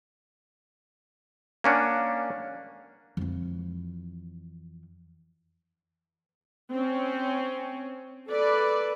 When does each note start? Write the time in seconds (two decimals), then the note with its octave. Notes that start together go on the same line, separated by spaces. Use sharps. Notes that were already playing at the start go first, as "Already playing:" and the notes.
1.64 A#3 C#4 D4 F#5
3.17 F2 E3
6.72 C4 C#4
8.28 A4 B4 D5